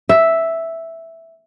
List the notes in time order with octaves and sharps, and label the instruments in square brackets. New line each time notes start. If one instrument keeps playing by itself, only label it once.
[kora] E5